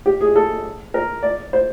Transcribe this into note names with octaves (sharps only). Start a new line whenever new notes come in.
G4
G#4
A4
A#4
D5
C5